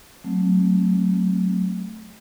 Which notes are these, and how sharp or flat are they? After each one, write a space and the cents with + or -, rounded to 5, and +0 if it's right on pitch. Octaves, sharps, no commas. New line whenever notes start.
F#3 +0 A3 +0 C4 +15